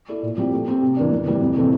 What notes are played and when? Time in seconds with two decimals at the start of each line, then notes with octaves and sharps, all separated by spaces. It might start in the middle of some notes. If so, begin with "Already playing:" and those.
0.09 E4 A4 D5
0.23 A#2
0.38 F3 C4 E4 G4
0.53 A3
0.68 C4 G4
0.82 C3
0.97 E3 A#3 D4
1.12 F2
1.26 E3 G3 C4
1.41 F2
1.55 C3 E3 A3 C4